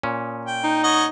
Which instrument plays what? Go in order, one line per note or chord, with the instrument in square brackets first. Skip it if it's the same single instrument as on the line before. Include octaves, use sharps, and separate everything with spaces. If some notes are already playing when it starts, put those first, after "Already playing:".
[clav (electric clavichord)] A#2 C#4
[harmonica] G5
[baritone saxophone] D#4
[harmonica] C#5 D#5 F#5